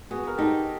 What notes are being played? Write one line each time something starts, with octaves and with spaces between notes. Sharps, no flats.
B3 F#4 G#4
A#4
D#4 G4 A4